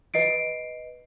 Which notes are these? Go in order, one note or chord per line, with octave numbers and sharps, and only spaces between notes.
B4 D#5 C7 D7